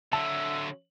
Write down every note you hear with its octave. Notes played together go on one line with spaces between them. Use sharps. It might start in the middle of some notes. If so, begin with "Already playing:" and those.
D3 F#3 E5 A5